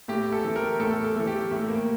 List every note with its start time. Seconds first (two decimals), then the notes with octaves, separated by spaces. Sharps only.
0.08 A2 G4
0.32 A4
0.44 E3 A3
0.56 A#4
0.80 A2 A4
1.04 A4
1.16 E3 A3
1.27 G4
1.51 A2 A3
1.68 A#3